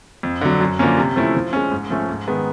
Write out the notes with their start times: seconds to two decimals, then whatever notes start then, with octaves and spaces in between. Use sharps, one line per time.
0.23 F2
0.41 D3 F#3
0.61 F#2
0.79 D3 F3 A#3 C#4
0.97 C3
1.16 F3 A3 C#4 E4
1.35 F3
1.53 G#3 C#4
1.72 G#2
1.90 F3 A3 C#4
2.09 G#2
2.28 D#3 G#3 B3